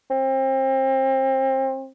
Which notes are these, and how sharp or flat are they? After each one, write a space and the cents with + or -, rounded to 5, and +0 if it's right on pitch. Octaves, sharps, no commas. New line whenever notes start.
C4 +30